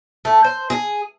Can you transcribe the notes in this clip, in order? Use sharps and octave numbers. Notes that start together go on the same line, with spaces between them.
A3
C5
G#4